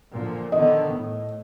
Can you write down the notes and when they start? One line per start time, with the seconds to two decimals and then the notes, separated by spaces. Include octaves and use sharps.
0.14 A#2 D3 F3
0.52 D3 D#3 B3 D#5
0.93 A2